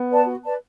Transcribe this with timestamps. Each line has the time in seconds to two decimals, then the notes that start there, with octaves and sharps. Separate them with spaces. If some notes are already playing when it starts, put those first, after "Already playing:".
Already playing: B3
0.11 B4 D5 A5
0.27 F#4
0.44 B4 D5 A5